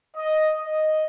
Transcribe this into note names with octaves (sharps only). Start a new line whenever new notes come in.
D#5
D#5